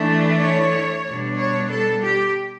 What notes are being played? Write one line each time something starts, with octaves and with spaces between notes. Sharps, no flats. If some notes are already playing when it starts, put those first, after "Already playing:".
Already playing: E3 A3 D4
C#5
B2 G3 D4
C#5
A4
G4